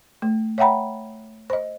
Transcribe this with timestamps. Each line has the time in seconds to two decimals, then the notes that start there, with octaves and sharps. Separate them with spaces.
0.22 A3
0.58 C#5 E5 F#5 G5 A#5 B5
1.50 C5 D#5